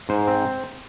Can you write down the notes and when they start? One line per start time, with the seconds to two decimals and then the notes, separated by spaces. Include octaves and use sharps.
0.09 G#2 C5
0.27 C4